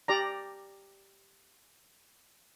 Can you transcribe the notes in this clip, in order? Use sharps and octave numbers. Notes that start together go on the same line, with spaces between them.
G4 D5 A#5